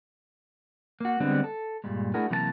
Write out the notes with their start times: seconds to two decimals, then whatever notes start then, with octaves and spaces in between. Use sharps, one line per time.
1.00 A#3 F#4
1.20 D3 G3 G#3 B3 C4 D4
1.44 A4
1.84 G2 A#2 G3 G#3
2.14 A3 D4 E4 F#4 G#4 A#4
2.30 C3 E3 F#3 A#3 E4 A5